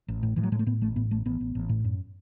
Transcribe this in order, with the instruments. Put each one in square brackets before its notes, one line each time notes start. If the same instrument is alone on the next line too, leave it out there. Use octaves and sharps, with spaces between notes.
[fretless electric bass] A1
A2
A2 E3
F#3
A2 G#3
A3
A2 B3
A1 A3
A2 B3
A1 A3
A1 B3
A1
A1
A2
F#2